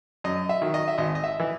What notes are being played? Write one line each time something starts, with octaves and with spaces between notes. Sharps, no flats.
F#2 D#5
E5
D#3 F#3
D#5
E5
G#1 D#5
D#5
E5
E3